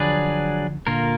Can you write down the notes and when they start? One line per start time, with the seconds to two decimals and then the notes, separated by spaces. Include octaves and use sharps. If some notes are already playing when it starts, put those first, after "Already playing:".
Already playing: D3 F3 F#3 D4 G#4 B4 D5
0.87 A#2 D3 A#3 F4 A#4